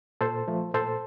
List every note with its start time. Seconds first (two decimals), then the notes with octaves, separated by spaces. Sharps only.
0.21 A#2 A4 C5
0.48 F3 A3
0.74 A#2 A4 C5